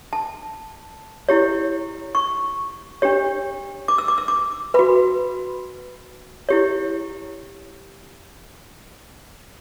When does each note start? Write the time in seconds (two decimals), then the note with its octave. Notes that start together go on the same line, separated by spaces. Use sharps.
0.13 A5
1.29 E4 G4 C#5
2.15 C#6
3.02 D4 G4 C#5
3.88 D6
3.98 E6
4.08 D6
4.18 E6
4.28 D6
4.74 F#4 B4 B5
6.49 E4 G4 C#5